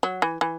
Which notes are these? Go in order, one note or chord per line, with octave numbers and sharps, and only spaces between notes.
F#3
E3
E3